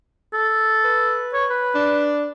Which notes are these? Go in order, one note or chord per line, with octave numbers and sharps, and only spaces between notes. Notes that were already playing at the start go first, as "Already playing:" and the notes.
A4
B4
C#5
B4
D4